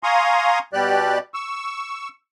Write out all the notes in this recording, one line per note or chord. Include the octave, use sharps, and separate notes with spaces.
F5 G#5 A#5 C6 C#6 D#6
B2 G3 G4 D5 F#6
C#6 E6